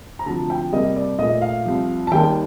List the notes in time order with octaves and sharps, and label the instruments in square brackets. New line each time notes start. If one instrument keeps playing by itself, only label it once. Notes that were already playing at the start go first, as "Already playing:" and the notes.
[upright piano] A#5
D2 C3 F3 A5
G5
C2 C3 G3 A#3 D#5
D5
A#2 A3 D#5
F5
C2 C3 F3
A5
D#2 D#3 G3 A#3 G5